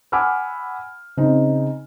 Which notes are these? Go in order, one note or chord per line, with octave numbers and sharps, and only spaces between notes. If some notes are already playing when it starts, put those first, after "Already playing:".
F#5 G#5 B5 D6 E6 F6
C#3 C4 D#4